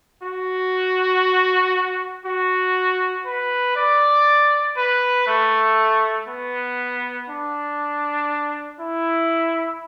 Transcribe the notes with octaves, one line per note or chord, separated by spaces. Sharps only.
F#4
F#4
B4
D5
B4
A3
B3
D4
E4